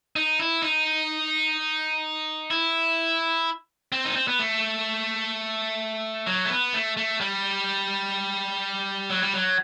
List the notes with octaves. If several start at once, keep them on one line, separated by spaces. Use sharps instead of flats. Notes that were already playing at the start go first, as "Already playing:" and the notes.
D#4
E4
D#4
E4
C4
D#4
C4
B3
A3
F#3
A3
B3
A3
A3
G3
F#3
G3
F#3